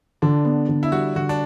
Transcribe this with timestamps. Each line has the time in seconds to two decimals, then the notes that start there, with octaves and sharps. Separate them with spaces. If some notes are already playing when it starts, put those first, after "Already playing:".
0.22 D3 D4
0.45 B3
0.69 D3
0.83 E4
0.92 G3 F#4
1.16 D3 F#4
1.29 D4